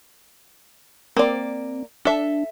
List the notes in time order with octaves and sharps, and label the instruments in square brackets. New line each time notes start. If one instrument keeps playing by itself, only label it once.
[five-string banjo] A#3 D5 [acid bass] C4
[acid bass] D4 [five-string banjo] A4 E5